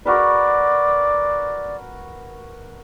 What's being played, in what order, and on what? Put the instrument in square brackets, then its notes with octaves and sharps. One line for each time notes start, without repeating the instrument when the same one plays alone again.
[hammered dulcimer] F#4 A#4 B4 [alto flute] D5